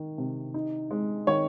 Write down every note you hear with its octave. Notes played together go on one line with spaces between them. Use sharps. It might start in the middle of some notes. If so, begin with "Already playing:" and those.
Already playing: D#3
C3
D#4
G#3
D#3 C#5